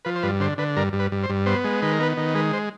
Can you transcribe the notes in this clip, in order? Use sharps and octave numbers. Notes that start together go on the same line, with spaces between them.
F3 B4
C5
G2 B4
D3 C5
D3 B4
G2 A#4
G2
B4
G2
C5
G2
B3 C5
G#3
D#3 B4
A#4
B3 B4
D#3
G#3 B4
C5